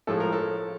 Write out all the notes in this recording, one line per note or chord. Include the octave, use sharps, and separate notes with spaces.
A2 F3 G#3 A4
A#4
A4